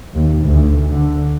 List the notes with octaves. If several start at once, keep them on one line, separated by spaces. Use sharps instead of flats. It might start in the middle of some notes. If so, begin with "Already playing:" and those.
D#2
D2
D3